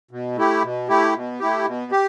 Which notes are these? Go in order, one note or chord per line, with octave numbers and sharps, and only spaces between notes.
B2
A3 E4 G4
B2
A3 E4 G4
B2
A3 E4 G4
B2
G4